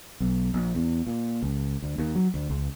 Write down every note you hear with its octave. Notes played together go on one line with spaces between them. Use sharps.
B1
A#1
E2
A#2
C#2
D2
D#2
F#3
D2
C#2